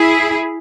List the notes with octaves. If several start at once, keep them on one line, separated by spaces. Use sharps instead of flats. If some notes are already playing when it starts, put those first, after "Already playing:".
Already playing: E4 G#4